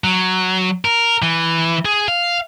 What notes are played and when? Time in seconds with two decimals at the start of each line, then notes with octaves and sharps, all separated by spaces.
0.04 F#3
0.85 A#4
1.22 E3
1.85 G#4
2.08 F5